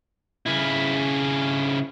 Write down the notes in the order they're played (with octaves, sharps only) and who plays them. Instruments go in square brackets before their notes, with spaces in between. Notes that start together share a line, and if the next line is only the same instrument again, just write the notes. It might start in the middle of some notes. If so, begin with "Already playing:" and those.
[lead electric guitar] C#3 E4